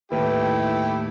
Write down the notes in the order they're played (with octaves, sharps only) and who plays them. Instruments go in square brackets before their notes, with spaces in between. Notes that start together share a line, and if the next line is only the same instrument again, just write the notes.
[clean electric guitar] D#2 A2 [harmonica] A3 G4 [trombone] E4 [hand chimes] B4